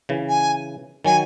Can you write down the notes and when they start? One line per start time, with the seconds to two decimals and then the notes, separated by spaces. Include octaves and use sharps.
0.09 C#3 E3
0.28 G#5
1.05 D#3 F#3 G#5